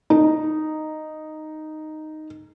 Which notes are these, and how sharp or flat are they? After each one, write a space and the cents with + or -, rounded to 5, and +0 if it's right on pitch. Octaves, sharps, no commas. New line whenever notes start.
D#4 -5